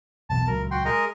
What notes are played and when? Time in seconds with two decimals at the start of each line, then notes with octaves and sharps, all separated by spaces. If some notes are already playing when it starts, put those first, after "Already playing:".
0.30 E1 B1 E2 A5
0.47 D#1 C#2 F#3 A#4
0.71 F#4 G5 C6
0.85 G#3 A#4 D#5